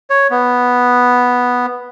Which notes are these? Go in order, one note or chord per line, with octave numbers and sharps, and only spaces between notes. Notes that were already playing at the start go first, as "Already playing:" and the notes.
C#5
B3